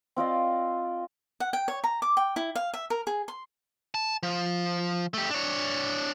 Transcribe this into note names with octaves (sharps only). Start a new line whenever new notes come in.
C4 F4 D5 D#5
F#5
G5
C#5
A#5
D6
G5
E4
F5
E5
A#4
G#4
C6
A5
F3
A3 G4
D4 C#5